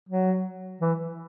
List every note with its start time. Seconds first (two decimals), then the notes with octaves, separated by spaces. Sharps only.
0.09 F#3
0.81 E3